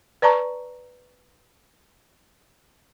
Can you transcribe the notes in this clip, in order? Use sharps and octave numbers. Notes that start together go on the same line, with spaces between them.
B4 D5 A5 A#5 C#6